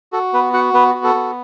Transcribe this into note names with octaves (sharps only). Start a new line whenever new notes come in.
F#4 A4
B3 B4
F#4 F#5
B3 B4
F#4
A4
B3